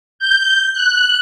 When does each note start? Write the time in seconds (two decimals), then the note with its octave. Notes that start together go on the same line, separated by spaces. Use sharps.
0.19 G6
0.73 F#6